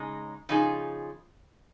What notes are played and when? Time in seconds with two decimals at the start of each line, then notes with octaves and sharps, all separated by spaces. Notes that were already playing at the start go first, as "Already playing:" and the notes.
Already playing: C#3 G#3 D#4
0.49 C#3 F3 D#4 G#4